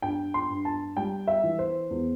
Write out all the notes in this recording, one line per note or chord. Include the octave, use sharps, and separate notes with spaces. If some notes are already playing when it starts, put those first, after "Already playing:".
G2 G5
C6
G2
A5
G3 G5
E5
E3
C5
E2